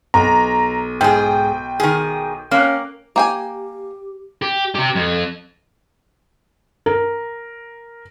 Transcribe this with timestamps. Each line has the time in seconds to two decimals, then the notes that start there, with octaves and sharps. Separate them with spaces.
0.14 B1 A#5
1.01 G#2 G#4 G5
1.80 D#3 G#4
2.51 A#3 C#4 F5 F#6
3.16 A#3 G4 G5 G#5
4.42 G4
4.75 C3 G4
4.95 F2
6.86 A#4